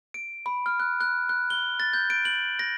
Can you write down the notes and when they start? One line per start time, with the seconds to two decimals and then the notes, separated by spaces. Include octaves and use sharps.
0.14 D7
0.46 B5
0.66 F6
0.80 F#6
1.01 F#6
1.29 F#6
1.50 G7
1.80 A6
1.93 G6
2.10 D7
2.25 F#7
2.59 A#6